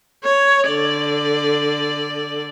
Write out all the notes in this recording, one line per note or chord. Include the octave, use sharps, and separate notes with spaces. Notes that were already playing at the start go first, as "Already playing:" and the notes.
C#5
D3 D5